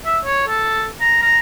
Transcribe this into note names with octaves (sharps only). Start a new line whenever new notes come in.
E5
C#5
A4
A#5
A#5